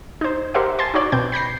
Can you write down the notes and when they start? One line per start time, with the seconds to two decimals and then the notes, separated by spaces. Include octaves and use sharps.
0.21 D#4 C5
0.54 G4 A#4 C5 E5 F#5
0.79 G#5 A5 C6
0.94 D#4 F#4 C#5 D5
1.12 B2 C4 G6
1.32 B5 G6 A#6 C7